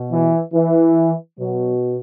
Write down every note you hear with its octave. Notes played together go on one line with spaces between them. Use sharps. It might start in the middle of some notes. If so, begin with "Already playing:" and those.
Already playing: B2
E3
E3
B2 F#3